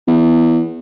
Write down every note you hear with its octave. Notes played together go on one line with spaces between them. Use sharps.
E2